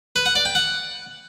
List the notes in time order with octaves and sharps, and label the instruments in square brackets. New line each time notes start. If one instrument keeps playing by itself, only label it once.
[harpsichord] B4
F#5
D5
G5
F#5